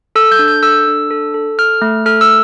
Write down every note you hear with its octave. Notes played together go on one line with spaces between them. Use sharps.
A4 E6
G6
D4
G6
A4 E6
D4
A4
A4
A4 F6
A3
A4 F6
E6